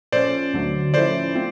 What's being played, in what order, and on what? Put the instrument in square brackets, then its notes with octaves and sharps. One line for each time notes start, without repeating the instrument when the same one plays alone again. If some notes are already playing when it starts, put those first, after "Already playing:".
[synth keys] A#2 F3 A3 C#4 [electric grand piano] C5 D5
[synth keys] D2 D3 F#3 A3
[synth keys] A2 F3 A3 C#4 E4 [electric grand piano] C5 D5
[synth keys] A3 C4 F4